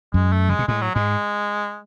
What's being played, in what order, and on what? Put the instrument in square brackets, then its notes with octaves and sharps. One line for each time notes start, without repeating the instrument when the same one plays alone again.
[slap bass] F#2 [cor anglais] G#3
[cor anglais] A3
[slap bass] C#3 [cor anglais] G#3
[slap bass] B2
[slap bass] A2 [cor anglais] G#3
[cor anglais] F#3
[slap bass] G#2 [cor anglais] G#3